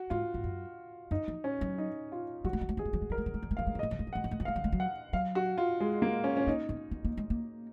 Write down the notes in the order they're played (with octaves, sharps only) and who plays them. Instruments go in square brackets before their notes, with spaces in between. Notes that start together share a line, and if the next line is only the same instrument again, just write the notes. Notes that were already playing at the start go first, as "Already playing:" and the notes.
Already playing: [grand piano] F#4
[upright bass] G#2 [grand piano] F4
[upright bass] G#2
F#2
[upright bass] F#2 [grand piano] D#4
[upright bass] F3
[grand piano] C#4
[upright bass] F#3
[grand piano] D#4
F4
[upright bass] F#3 [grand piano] F#4
[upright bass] G#3
F#3
G#3
[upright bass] F#3 [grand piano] G#4
[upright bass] G#3
F#3
G#3
[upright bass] F#3 [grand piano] A#4
[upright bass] G#3
F#3
G#3
F#3
G#3
[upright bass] F#3 [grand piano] F5
[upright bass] G#3
F#3
[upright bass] G#3 [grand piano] D#5
[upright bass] F#3
G#3
F#3
[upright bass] G#3 [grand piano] F#5
[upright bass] F#3
G#3
F#3
[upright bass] G#3 [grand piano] F5
[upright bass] F#3
G#3
F#3
[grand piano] F#5
[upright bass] F#3 [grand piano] F5
[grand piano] F#4
F4
G#3
A#3
C#4
C#4
[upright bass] A#3 [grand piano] D#4
[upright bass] B3
B3
A#3
G#3
A#3